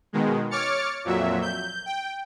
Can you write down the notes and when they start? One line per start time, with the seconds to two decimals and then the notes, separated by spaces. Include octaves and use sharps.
0.13 B2 D#3 G#3
0.51 C#5 D6 F6 A6 C#7
1.05 F2 A#2 F#3 E5
1.42 G6
1.86 G5